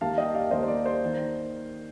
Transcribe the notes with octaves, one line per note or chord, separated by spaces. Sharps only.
D#2 D#3 G3 A#3 F5 A5
D#5 G5
D5 F5
D#2 D#3 G3 A#3 C5 D#5
C5
D5
C5
D#3 A#3